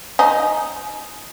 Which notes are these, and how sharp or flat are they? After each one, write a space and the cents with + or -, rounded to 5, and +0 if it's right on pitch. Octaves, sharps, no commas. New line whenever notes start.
D#4 +0 G#5 +25